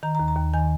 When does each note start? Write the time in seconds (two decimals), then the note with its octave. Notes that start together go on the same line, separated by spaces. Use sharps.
0.03 D#3 A#5
0.15 A#5
0.19 D#2
0.28 A#5
0.37 D#2
0.53 D#3 G#5